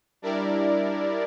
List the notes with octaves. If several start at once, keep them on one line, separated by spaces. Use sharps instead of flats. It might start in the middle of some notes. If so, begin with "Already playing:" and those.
G3 D4 E4 A#4 D5